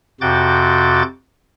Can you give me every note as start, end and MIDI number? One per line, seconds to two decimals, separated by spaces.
0.21 1.02 41
0.21 1.02 48
0.21 1.02 66
0.21 1.02 86
0.21 1.02 91
0.21 1.02 93